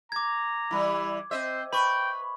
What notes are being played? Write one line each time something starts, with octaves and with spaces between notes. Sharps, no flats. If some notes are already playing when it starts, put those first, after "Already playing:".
A#5 D6 G#6
E3 G3 E4
C4 C5 D#5 E5
B4 G5 B5 C#6